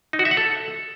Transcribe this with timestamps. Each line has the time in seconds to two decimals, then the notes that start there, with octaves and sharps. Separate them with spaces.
0.13 D#4
0.19 F#4
0.25 E5
0.31 F#5
0.37 A4